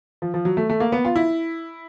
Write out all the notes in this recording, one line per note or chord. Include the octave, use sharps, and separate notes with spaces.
F3
F3
F#3
A3
A3
A#3
B3
F4
E4